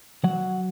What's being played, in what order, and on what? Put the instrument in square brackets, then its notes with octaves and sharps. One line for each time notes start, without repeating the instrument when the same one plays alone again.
[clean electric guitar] F#3 F#5